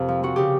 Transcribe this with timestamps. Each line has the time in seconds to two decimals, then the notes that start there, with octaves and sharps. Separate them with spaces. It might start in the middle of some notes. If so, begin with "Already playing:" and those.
Already playing: F2 C3 A#4
0.08 F3
0.23 F3 F#4
0.36 C#3 G4